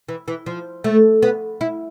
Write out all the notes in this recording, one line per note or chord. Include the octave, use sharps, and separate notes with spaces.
E3
E3
F3
A3
B3
E4